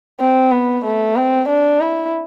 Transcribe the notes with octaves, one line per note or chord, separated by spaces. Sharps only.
C4
B3
A3
C4
D4
E4